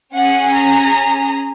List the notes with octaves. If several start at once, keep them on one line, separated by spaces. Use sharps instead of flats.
C#4 G#4 F#5
A#5